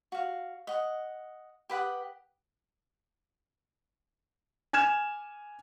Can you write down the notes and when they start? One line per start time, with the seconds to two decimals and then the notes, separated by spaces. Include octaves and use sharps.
0.12 F#4 F5
0.67 D#5 F#5
1.69 G4 B4 F#5 D#6
4.73 G#5 F6 G#6 E7